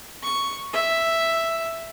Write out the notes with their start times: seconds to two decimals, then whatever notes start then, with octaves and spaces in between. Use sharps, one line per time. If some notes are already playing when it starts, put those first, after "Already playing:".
0.23 C#6
0.73 E5